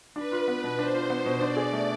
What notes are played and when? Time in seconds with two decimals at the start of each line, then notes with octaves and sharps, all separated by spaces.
0.16 D4 B4
0.32 F4
0.48 B3
0.64 B2
0.79 D4 C5
0.94 F4
1.10 B3
1.25 B2
1.41 D4 D5
1.57 G#4
1.73 A3